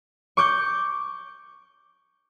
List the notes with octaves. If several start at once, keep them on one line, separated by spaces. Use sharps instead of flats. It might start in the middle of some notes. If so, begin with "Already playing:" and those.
C#6 D6 G6